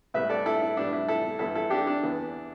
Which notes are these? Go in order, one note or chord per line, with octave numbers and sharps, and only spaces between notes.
A2 G3 B3 B4 E5
A4 D5
E4 A4
E4
A2 G3 B3 D4
E4
E4 A4
G2 E3 B3 E4 A4
E4 A4
D4 G4
D4
E2 E3 B3